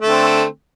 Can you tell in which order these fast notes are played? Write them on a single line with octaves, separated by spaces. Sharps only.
A3 D3 C4